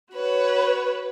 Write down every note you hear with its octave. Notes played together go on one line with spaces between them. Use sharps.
F#4 B4 C#5